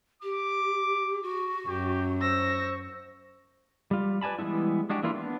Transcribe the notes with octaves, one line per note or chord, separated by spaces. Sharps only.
G4 D6
F#4
F#2 G4
C5 C#6 E6 A#6
G3 F4
B4 D5 G#5 A5 B5
E3 G3 G#3 B3 E4
G#3 D4 F#4 G4
E3 A#3 D4 E4 F4
B3 D4